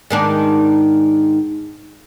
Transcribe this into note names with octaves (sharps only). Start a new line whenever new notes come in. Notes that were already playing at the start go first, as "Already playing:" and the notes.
G#2 D#3 D4